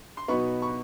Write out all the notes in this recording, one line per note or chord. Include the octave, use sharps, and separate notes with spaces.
C6
B2 F#3 B3 D#4 B5 C#6
B5 C#6